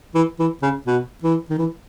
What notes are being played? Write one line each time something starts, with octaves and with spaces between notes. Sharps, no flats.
E3
E3
C#3
B2
E3
D#3
E3